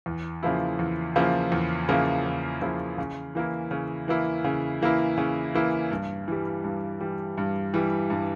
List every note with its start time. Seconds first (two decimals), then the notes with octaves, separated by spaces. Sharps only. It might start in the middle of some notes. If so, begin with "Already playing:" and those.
0.06 E2
0.43 C#3 F3 A#3 E4
0.79 E2
1.16 C#3 F3 A#3 E4
1.52 E2
1.89 C#3 F3 A#3 E4
2.26 E2
2.62 C#3 F3 A#3 E4
2.98 C#3
3.35 E3 A#3 E4
3.71 C#3
4.08 E3 A#3 E4
4.44 C#3
4.82 E3 A#3 E4
5.18 C#3
5.54 E3 A#3 E4
5.91 G2
6.28 E3 G3
6.64 G2
7.01 E3 G3
7.38 G2
7.74 E3 G3
8.10 G2